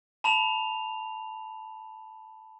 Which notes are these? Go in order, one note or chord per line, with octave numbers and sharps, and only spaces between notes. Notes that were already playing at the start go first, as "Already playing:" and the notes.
A5 B5 F7